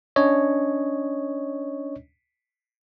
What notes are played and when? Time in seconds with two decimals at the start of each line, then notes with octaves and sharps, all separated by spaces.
0.16 C#4 D4 C#5 D#5